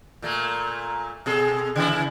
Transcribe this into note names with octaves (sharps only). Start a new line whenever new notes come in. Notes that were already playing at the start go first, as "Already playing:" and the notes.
A#2 A3 A#3
B2 G#4 A4
C#3 E3 E4